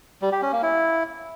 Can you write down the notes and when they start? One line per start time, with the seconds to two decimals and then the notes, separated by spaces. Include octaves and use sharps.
0.22 G3
0.32 G4
0.42 C#4
0.52 A#3
0.63 E4